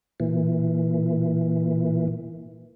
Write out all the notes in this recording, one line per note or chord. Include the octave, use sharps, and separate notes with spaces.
A#2 E3